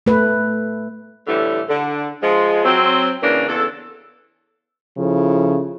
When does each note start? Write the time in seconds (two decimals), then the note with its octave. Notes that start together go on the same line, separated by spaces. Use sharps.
0.06 A3 B4
1.27 A2 D3 E3 G3 A3
1.69 D3
2.21 F3 G#3
2.64 F#3 C4
3.22 C#3 E3 A#3 D4
3.49 E2 C#3 A4
4.98 C#3 F3 E4 A4